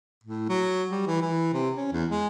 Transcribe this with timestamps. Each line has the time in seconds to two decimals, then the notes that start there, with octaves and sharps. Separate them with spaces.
0.24 A2
0.49 F#3
0.91 G3
1.07 E3
1.21 E3
1.53 C3
1.76 C#4
1.92 E2
2.10 G#3